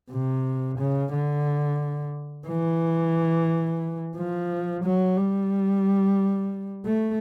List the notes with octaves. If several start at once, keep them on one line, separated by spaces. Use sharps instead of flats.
C3
C#3
D3
E3
F3
F#3
G3
A3